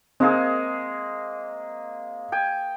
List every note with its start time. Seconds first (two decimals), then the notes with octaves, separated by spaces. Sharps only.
0.20 G#3 A#3 C4 G#4
2.32 G5 G#5